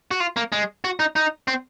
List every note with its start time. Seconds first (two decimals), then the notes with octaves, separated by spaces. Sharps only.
0.11 F#4
0.20 F4
0.37 A#3
0.52 G#3
0.84 F#4
0.99 D#4
1.16 D#4
1.48 C4